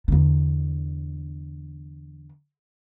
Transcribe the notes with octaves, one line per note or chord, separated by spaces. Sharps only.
E2 D3